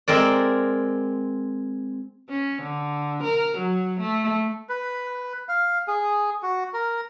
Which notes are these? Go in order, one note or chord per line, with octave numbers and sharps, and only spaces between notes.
G#3 C4 A#4 D5
C#4
D3
A#4
F#3
A3
B4
F5
G#4
F#4
A#4